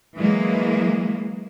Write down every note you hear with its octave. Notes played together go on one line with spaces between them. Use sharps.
E3 F#3 G#3 A#3